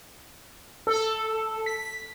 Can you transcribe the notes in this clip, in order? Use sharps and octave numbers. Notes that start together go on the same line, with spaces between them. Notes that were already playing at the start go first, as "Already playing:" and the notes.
A4
B6